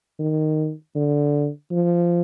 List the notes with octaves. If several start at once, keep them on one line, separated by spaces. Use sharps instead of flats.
D#3
D3
F3